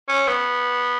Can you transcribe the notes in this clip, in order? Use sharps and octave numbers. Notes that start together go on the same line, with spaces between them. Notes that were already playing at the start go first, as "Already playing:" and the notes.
C#4
B3